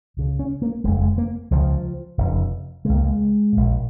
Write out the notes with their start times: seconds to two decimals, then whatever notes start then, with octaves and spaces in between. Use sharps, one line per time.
0.17 C#2 C#3
0.39 C#4
0.62 A#3
0.84 F1 G#3
0.87 F2 C#3
1.02 G#3
1.18 A#3
1.51 C#2 C#3 F3
2.18 F1 F2 C#3
2.85 C#2 C#3 G#3
2.95 A#3
3.04 G#3
3.53 A#1 A#2